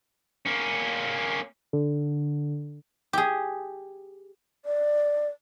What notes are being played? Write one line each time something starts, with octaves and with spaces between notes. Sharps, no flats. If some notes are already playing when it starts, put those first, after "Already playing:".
A#3 C#4
D3
G4 G#4
D5